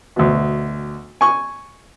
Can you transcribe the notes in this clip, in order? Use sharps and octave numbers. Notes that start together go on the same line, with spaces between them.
D2 B2
G#5 C#6